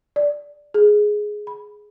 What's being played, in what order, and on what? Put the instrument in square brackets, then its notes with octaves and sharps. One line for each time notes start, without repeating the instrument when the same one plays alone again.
[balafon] D5
G#4
B5